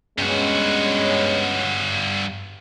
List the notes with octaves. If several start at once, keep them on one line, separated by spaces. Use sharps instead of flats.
G2 G#3 B3 C#4 F#4